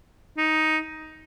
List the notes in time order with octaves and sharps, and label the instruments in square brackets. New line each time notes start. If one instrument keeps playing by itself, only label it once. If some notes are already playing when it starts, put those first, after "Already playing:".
[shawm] D#4